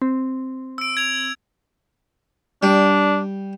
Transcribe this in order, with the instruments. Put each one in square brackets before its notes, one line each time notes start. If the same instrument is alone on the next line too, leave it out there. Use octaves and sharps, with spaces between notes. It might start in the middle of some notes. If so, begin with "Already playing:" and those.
[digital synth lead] C4
[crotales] E6 D7
G#6 F7
[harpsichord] G3 [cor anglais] D4